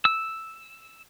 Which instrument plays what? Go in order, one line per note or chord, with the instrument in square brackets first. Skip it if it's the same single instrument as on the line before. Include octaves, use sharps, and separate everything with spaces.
[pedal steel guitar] E6